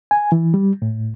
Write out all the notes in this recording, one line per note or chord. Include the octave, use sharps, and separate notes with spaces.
G#5
E3
G3
A2